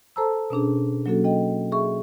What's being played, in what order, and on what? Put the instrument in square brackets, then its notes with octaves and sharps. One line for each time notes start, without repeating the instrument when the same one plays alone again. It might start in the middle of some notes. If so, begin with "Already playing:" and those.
[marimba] A4 C5 A5 A#5 E6
B2 C#4 D4 G#4
F#3 A#3 C#4 F#4 A4
A4 D#5 G5
G#4 E5 C#6